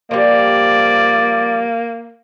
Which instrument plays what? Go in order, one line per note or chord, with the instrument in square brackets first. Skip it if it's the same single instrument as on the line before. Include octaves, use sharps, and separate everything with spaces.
[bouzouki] F3 G3 [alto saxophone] A#3 [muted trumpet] D5